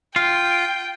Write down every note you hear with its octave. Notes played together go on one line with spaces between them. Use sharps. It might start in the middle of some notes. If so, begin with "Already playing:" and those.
F4 G5